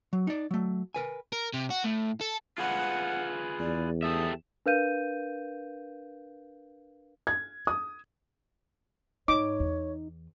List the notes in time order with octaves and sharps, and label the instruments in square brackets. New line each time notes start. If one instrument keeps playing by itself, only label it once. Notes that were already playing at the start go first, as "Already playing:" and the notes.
[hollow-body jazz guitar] F#3
D#4 D5
F#3 A3
A#4 B4 G#5
[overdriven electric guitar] A#4
C3
F#4
A2
A4
[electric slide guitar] F4 G#4 B4 [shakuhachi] F#5
[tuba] E2 [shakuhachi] D5
[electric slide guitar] G4 A4 E5 [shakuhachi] D#6
[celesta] D4 A#4 B4 F5 G6 D#7
[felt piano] G#6
D#6
[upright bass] G#2 [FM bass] D#4 [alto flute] C#5 [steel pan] D6
[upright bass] E2